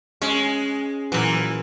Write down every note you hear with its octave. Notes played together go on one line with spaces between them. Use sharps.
G#3 C#4 C#5
A#2 E3 F#3